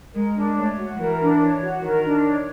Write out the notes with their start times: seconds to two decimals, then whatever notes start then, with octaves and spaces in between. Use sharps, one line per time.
0.14 G#3 A#4
0.35 D4
0.56 A3 C#5
0.77 F#4
0.97 E3 A#4
1.19 D4
1.40 C#5
1.61 F#4
1.81 D#3 A#4
2.03 D4
2.23 C#5